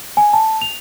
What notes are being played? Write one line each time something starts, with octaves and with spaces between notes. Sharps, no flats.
G#5
A5
F7